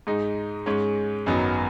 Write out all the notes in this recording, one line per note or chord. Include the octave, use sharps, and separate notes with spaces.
G#2 G#3 D#4
G#2 G#3 C#4
G#1 F#2 F#3 B3 D#4